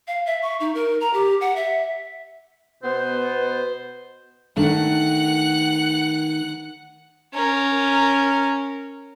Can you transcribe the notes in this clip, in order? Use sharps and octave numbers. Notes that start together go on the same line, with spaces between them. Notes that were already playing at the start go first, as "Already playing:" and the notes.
F5
E5
C#6
D#4
A#4
A#5
G4
F#5
E5
B2 B3 C5
D#3 A3 D4 F#5 F#6
C#4 A#4